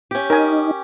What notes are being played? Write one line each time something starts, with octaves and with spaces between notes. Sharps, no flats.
C#4 G4
D#4 A#4 G#5